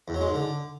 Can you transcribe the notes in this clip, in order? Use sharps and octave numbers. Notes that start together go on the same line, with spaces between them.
E2
F#3
G#3
G#2
D3